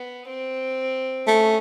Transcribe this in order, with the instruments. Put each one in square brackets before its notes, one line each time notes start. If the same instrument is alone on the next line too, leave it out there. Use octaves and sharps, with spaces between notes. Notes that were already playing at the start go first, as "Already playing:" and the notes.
Already playing: [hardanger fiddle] B3
C4
[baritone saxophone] A3 [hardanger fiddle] C#4